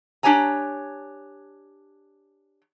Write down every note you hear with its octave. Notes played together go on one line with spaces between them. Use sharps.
D4 G4 C#5 G#5 A#5